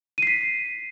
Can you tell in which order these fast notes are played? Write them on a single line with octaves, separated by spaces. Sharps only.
D#7 C7 B6